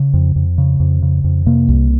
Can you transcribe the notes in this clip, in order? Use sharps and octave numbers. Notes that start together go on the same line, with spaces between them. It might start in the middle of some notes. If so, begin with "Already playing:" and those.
Already playing: C#3
F2
F2
C#3
F2
C#3
F2
C3 A#3
C2